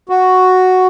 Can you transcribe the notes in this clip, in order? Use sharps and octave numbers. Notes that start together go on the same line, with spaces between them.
F#4